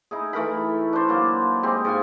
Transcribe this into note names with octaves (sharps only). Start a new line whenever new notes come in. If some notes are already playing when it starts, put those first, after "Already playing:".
D#4 E4 G#4
E3 A3 A#4 B5
D4 C5
F#3 A#3
G#3 C4 G4
G#2 F4 G#5